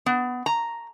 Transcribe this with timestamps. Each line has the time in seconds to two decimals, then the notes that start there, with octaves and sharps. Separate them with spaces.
0.06 B3
0.46 A#5